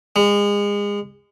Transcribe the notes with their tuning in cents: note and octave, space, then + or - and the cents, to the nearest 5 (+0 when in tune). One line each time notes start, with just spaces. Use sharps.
G#3 -30